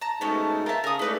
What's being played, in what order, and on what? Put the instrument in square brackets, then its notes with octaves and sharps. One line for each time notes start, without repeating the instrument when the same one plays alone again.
[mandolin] A5 A#5
[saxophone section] G#2 B2 A3 [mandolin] B3 C#4 A5
[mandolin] F4 A5 [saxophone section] A#4 E5
[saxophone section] C#3 [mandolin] A#4 D#6
[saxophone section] G#3 A3 [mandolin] E4 B4 D5